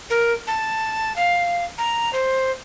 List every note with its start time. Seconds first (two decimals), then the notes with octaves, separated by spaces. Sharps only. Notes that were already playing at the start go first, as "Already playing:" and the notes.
0.10 A#4
0.47 A5
1.16 F5
1.78 A#5
2.13 C5